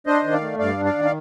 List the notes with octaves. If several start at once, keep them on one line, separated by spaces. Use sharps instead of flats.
D4 C5 D#5
D#3
D5 F5
A3
G2 D5 F5
D4
D5 F5
D#3
F5